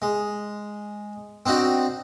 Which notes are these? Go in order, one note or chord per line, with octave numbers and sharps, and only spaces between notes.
G#3
C4 D4 D#4 F#4